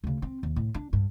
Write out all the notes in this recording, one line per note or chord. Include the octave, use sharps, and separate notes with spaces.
D2 C#3
C4
D#2
A2
D4
G2